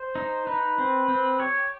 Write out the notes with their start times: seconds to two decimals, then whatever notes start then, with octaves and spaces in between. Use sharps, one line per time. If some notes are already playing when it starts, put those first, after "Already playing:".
Already playing: C5
0.15 D#4
0.46 D#4 B4
0.78 C4
1.08 C4
1.39 G4 C#5